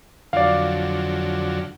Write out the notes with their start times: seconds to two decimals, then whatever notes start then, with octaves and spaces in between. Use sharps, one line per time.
0.33 F2 D3 F#3 D5 F5